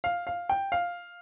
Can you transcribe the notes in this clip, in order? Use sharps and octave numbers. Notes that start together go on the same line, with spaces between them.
F5
F5
G5
F5